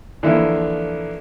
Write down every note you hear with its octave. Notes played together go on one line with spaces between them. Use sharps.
D3 E3 F3 A#3 E4